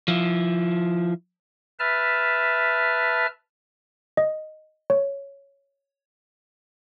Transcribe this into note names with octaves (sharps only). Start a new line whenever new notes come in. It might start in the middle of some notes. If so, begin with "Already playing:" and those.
F3 E4
B4 E5 A5 F6
D#5
C#5